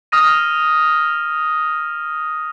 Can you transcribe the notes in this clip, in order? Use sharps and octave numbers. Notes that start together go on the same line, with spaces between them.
D#6 F6 A#6 D#7